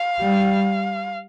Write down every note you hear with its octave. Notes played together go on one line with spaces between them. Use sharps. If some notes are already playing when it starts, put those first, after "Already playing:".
Already playing: F5
G3